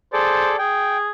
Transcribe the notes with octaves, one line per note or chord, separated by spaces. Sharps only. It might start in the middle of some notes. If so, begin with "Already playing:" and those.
G#4 A4 C5 D5
G#4 G5